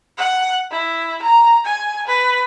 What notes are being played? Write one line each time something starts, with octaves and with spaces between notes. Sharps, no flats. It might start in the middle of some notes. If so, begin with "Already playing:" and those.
F#5
E4
A#5
G#5
B4